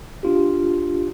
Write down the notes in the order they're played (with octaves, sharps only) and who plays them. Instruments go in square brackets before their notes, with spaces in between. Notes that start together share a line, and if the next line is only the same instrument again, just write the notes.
[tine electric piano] D4 F4 G4